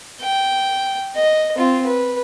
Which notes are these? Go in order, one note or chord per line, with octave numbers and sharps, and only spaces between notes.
G5
D#5
C4 F4
B4